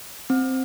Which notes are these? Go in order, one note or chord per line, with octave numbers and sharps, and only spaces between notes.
C4